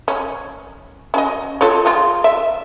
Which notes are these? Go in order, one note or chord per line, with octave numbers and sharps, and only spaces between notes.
C#4
C#4 F#4 D#5
F4 A4 C#5
F3 G#3 F4
E5